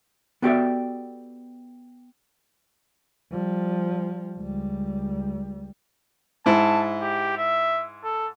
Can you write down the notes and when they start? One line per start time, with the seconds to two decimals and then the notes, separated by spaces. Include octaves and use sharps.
0.42 B3 F#4 G4 A4 D5 E5
3.32 F3 G3
4.38 C#2 G3
6.46 G#2 E4 A5
7.02 G4
7.37 E5
8.04 A4